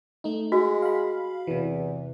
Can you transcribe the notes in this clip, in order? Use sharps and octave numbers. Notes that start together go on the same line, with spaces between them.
A3 D#4
G#3 F#4
F5 B5
E2 C3 E3